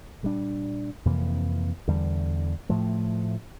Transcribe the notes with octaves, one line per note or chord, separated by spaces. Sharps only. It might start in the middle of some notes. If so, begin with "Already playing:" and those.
A#2 G3 D4
F2 C3 E3 A#3
E2 D3 G3
A2 F3 A3